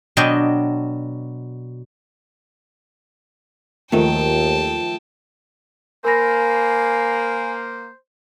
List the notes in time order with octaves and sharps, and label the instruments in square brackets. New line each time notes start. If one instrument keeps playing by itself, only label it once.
[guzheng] B2 F#3 D4 D#5 G5
[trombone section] D#2 [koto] D#3 F#3 [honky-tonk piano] F3 A3 [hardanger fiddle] G5 A5
[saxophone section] A#3 [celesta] A#4 B5 A#6 [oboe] C5 [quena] G#5